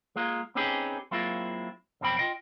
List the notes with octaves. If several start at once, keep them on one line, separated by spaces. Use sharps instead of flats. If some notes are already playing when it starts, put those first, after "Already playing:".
G#3 A#3 F4 A#4
C4 C#4 D#4 G4 G#4 B4
F#3 G#3 A#3 C4 E4 F4
B1 F2 B2 C4 G5 B5
F4 D#5 G5